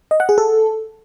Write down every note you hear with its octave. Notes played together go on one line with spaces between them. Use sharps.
D#5
F#5
G#4
A4